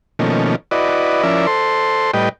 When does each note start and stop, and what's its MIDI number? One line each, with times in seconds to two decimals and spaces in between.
0.19 0.56 47
0.19 0.56 51
0.19 0.56 53
0.19 0.56 57
0.19 0.56 58
0.19 0.56 61
0.71 1.23 64
0.71 1.23 66
0.71 1.23 71
0.71 1.23 74
0.71 1.23 75
1.23 1.47 53
1.23 1.47 61
1.23 1.47 64
1.23 1.47 70
1.23 1.47 74
1.23 1.47 76
1.47 2.11 69
1.47 2.11 72
1.47 2.11 84
2.14 2.29 45
2.14 2.29 55
2.14 2.29 71
2.14 2.29 75
2.14 2.29 79